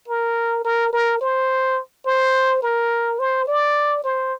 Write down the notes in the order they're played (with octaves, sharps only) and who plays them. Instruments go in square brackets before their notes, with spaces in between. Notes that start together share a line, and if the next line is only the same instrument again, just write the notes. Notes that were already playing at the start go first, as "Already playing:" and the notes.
[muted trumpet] A#4
A#4
A#4
C5
C5
A#4
C5
D5
C5